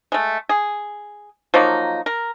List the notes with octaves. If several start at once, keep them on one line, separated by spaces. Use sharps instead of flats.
G#3 A3
G#4
F3 F#3 A#3 D#4
A#4